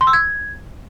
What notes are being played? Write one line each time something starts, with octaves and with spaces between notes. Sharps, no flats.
C6
E6
G#6